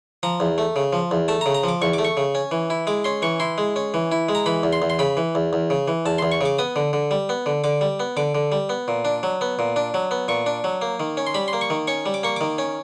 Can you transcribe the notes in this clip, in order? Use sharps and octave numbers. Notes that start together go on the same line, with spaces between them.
F3 A#5
E2
A3
C#3
F3
E2
A3 A5
A#5
C#3
A#5
F3 D6
E2 C#6
A3 D6
C#6
C#3
C#4
E3
E4
G#3 D6
C#4 C6
E3 C#6
E4 C6
G#3
C#4
E3
E4
G#3
A#5
E3 B5
E2
C6
E2
C6
C#3 B5
E3
E2
E2
C#3
E3
E2 A5
E2 C6
C#6
C#3 D6
B3 D#6
D3
D3
G3
B3
D3
D3 D6
G3
B3
D3 D6
D3
G3
B3
A#2
D4
F#3
B3
A#2
D4
F#3
B3
A#2 C#6
D4
F#3
A#3
D#3
C#4
C6
G3 B5
C6
A#3
C#6
D#3
C#4 C#6
G3
D6
A#3 C#6
D#3 D6
C#4